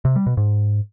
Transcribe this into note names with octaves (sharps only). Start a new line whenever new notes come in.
C3
G3
B2
G#2